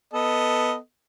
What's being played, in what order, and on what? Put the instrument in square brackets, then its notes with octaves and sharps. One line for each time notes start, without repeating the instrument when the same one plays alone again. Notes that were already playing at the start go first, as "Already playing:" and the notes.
[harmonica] B3 A4 D#5